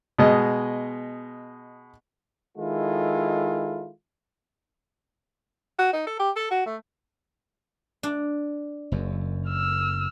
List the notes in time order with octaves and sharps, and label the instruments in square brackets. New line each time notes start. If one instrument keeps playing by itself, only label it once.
[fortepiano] B2 G#3 D#5
[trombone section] D#3 G#3 E4 F4 A4
[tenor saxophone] F#4
D#4
A4
G4
A4
F#4
A3
[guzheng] D4
[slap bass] F#1 F#2
[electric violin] E6 F6